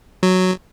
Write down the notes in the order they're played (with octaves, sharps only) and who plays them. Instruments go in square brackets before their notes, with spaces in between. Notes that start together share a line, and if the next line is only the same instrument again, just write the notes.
[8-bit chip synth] F#3